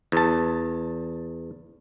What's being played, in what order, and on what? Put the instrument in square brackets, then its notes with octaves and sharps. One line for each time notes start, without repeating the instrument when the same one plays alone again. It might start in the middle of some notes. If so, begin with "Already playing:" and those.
[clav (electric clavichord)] E2 A5